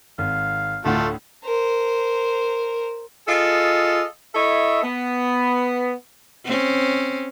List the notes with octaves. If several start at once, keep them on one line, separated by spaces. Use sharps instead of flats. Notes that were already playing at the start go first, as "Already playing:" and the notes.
G#1 F5
D2 A2 A3 F4 F#5
A#4 C5
F4 G#4 A4 D#5
E4 A4 C#5 D#5 E5
B3
C4 C#4